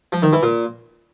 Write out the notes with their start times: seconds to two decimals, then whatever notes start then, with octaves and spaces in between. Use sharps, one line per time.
0.12 F3
0.23 D#3
0.33 E3
0.43 A#2